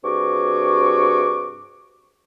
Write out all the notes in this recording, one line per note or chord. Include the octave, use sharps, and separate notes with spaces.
G2 C3 F#4 G#4 C#6 D6